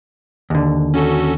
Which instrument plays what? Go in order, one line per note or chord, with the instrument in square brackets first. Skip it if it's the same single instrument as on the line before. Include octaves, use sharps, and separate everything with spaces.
[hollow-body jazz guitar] D#2 D3
[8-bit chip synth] C#4 F#4 A4